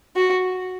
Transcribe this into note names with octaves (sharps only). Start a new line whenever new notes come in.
F#4